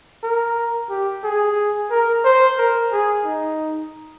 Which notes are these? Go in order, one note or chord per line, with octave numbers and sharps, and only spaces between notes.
A#4
G4
G#4
A#4
C5
A#4
G#4
D#4